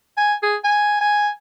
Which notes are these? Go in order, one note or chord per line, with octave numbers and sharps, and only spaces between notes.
G#5
G#4
G#5
G#5